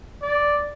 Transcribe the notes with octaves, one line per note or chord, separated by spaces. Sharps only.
D5